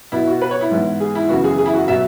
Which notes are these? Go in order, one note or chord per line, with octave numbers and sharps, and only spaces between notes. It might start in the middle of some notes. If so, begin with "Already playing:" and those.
B2 B3 E4
F#4
B4
C#5
E4
G#2 E3 B3
G#4
E4
F#2 C#3 E3 B3 F#4
G#4
G#4
E4
F#4
B2 F#3 E5